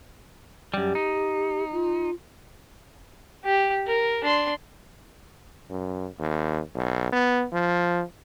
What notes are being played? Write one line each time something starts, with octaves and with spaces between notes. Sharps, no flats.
F#2 G3 G4
D#4
F4
G4
A#4
D4 C6
F#2
D#2
B1
B3
F3